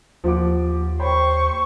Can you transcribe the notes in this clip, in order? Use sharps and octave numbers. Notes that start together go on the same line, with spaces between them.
D#2 F3 F#5 D6
C5 C#5 G5 B5 C#6